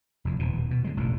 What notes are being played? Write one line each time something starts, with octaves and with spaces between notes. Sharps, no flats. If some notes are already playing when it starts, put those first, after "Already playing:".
F1 E2
D#1 E2 B2
B2
D3 G#3
E1 A1 F2 A#2